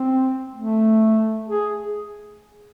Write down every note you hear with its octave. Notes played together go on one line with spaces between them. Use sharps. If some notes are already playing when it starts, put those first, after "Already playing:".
Already playing: C4
A3
G#4